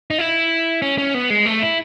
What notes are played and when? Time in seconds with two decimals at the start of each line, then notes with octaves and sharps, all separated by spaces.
0.10 D#4
0.19 E4
0.82 C#4
0.98 C#4
1.14 B3
1.30 G#3
1.46 A3
1.62 E4